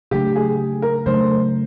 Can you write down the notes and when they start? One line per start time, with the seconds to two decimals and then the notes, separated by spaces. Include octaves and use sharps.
0.11 C#3 F#3 A3 D4 G4
0.36 G#4
0.82 A#4
1.06 C#3 F#3 A3 D4 C5